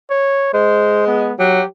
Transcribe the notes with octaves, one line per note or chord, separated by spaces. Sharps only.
C#5
G#3 C5
B3
F#3 G4